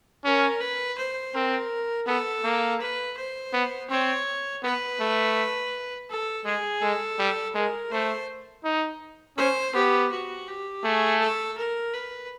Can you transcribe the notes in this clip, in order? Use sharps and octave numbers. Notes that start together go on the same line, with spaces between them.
C#4 A#4
B4
C5
C4 A#4
B3 A4
A#3
B4
C5
B3
C4 C#5
B3 B4
A3
A4
G#3 G#4
G#3 A4
G3
G#3 A#4
A3 C5
D#4
C#4 C5
B3 G4
F#4
G4
A3 G#4
A4
A#4
B4